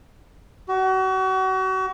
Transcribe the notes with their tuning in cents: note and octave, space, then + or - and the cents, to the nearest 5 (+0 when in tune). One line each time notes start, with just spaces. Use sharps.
F#4 +35